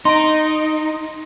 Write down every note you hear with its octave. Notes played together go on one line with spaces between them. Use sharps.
D#4 C6 D7